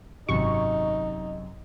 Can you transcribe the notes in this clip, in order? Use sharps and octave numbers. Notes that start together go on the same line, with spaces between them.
G#1 F#2 C3 D#4 C#6